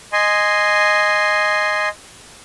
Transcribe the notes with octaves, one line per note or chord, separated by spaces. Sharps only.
D#5 G#5 C6